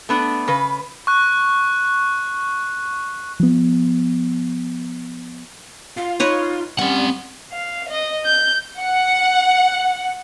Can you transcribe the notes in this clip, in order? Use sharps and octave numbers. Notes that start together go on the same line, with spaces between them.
A3 B3 D4
C#3 B4
C#6 F#6
F3 B3
F4 F5
D#4 B4 C#5 D#5
G3 C4 C#4 F#5 C#6
F5
D#5
G6
F#5